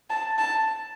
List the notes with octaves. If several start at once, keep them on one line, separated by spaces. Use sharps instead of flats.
A5
A5